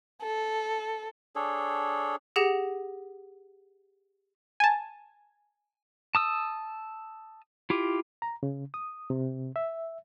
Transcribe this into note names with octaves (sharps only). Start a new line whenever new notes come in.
A4
D4 G#4 A4 C#5
G4 G#4 F#5 A#6 E7
G#5 A5
A5 D#6 E6
E4 F4 G4
A#5
C#3
D#6
C3
E5